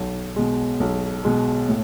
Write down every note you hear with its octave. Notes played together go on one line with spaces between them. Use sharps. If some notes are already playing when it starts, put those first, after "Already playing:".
Already playing: B1
B2 G#3
B1
B2 G#3
A2